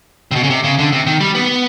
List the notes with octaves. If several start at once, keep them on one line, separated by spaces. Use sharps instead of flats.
C3
B2
C#3
C3
C#3
D3
C3
D#3
G3
B3